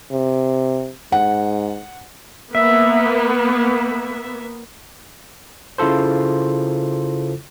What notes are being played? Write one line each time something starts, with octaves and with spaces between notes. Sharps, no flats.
C3
G#2 F#5
A#3 B3 E5
C#3 E4 F4 A4 C5